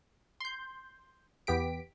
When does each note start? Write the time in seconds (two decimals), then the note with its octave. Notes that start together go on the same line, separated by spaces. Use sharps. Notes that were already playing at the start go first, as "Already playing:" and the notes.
0.40 C6 G6
1.47 E2 B3 G4 B6 D7